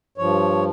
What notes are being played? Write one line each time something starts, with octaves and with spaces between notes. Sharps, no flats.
G2 F3 C#5